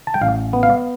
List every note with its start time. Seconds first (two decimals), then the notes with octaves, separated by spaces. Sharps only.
0.07 A5
0.14 G5
0.21 A1 F5
0.53 B3
0.63 F5